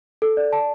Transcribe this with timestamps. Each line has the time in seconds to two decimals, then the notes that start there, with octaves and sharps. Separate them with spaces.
0.22 A4
0.37 D5
0.52 A5